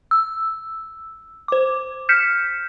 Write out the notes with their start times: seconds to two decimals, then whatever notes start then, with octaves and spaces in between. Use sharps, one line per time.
0.11 E6
1.48 C5 D6
2.09 F6 G6 B6 C#7 E7